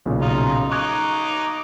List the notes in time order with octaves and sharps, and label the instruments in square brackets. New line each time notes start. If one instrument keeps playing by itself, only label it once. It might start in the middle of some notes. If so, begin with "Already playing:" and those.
[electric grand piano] B1 A#2 C#3
[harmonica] D#4 F4
[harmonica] D#4 D6 [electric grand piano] C#6 F#6 G#6